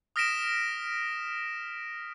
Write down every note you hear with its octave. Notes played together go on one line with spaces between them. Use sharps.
D#6 F6 A#6 B6 D7 E7